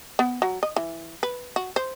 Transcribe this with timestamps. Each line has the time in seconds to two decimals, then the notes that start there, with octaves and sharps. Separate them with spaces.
0.19 B3
0.42 F#3
0.63 D#5
0.76 E3
1.23 B4
1.56 F#4
1.76 C5